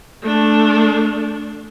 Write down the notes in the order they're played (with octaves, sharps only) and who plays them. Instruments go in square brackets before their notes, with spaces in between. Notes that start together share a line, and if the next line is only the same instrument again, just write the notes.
[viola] A3 D4